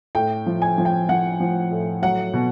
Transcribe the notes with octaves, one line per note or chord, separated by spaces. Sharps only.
A2 G5
F3
G#5
F3
G5
F3 F#5
F3
A2
F#3 F#5
B2